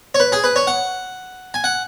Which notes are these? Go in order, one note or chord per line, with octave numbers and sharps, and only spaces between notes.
C#5
B4
G#4
B4
C#5
F#5
G#5
F#5